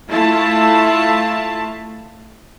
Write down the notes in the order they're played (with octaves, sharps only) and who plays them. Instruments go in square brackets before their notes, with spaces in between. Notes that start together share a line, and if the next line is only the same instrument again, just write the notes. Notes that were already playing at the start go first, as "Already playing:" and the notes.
[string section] A3 E4 F4 A5